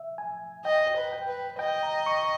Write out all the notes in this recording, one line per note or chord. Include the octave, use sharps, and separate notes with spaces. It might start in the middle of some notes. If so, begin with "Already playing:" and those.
Already playing: E5
G#5
D#5 G5
B4
G5
B4
D#5 G5
A#5
C#6